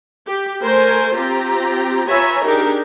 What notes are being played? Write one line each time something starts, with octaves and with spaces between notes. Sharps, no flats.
G4
A3 A#4 C5 G#5
C4 F4 G4 A#5
F4 B4 C#5 E5 G#5 A#5
D4 D#4 G4 G#4 A#4